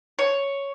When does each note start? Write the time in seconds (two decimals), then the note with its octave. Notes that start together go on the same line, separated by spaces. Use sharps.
0.19 C#5